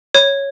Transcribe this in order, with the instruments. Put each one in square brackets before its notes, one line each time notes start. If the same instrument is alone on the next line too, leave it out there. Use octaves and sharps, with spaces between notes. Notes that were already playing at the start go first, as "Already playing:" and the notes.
[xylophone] C#5